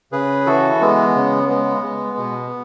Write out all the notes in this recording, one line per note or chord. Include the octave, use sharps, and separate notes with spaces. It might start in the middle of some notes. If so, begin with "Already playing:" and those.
C#3 G#4 B4
E3 F#4 A4
G#3 B3
C#3
G#3 B3
G#3
B2